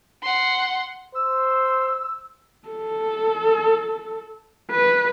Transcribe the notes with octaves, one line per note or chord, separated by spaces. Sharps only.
F#5 C6
C5 E6
A4
B4